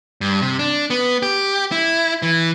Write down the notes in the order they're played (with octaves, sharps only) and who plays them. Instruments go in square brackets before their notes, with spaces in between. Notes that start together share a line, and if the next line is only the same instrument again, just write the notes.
[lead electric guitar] G2
C3
D4
B3
G4
E4
E3